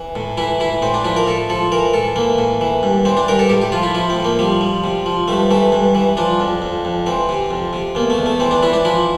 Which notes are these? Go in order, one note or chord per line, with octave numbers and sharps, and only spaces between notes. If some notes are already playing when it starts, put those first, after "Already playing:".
Already playing: E3
A2
E3 E4
E3 E4
A2 C4
D4
F3 E4
A#4
A2 A4
F3 A4
E3 A#4
A2 A4
E3 A#3
A2
E3
G2
E3 C4
D4
G2 A#4
A4
A2 G4
G4
F3 F4
E4
F3 E4
C4
A2
A#3
F3 G3
F3
C3
F3
G2 A3
E3 A3
G2
E3
F3 D4
F2
F2
F2
E3 C4
C3
F2
C3
E2 A#3
A3
E2
A3
E3 C4
D4
E3 E4
D4
F3 E4